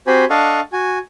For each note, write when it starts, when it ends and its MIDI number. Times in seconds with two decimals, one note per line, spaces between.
0.07 0.25 60
0.07 0.25 66
0.07 0.25 67
0.07 0.25 72
0.07 0.25 80
0.07 0.25 83
0.30 0.60 62
0.30 0.60 69
0.30 0.60 75
0.30 0.60 77
0.30 0.60 78
0.30 0.60 85
0.73 0.99 66
0.73 0.99 80